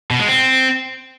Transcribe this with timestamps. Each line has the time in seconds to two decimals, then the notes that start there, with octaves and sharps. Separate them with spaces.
0.11 B2
0.19 G#3
0.28 C4